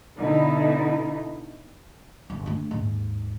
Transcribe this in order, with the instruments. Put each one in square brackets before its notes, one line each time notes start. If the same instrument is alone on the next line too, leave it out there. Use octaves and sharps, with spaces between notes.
[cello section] B2 D3 D#4 E4
[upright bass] G1
A3 D4
D#2 G#2